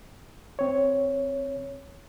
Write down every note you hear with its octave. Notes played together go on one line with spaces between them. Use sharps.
C4 C#5